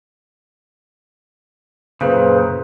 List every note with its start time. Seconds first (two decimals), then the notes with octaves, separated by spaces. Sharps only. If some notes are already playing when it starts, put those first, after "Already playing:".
2.01 F#2 A#2 C#3 G#4 B4 C5